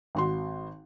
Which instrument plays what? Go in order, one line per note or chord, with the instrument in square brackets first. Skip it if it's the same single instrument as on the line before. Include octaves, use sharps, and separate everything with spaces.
[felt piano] G#1 F#4 C6